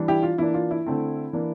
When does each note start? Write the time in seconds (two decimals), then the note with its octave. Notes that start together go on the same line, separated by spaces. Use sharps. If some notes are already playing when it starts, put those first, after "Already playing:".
Already playing: E3 G3 D4
0.08 E4 G4
0.23 F4
0.38 E3 A#3 D4 E4
0.54 F4
0.71 E4
0.86 D3 A3 C4
1.33 E3 A#3 D4